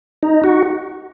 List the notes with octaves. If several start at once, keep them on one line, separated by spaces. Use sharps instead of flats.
D#4
F#4